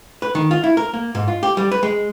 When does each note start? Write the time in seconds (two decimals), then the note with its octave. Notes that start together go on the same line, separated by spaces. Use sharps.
0.22 B4
0.35 D#3
0.51 F4
0.64 E4
0.77 A#4
0.94 A#3
1.15 G#2
1.28 F4
1.43 G4
1.57 G3
1.72 B4
1.83 G#3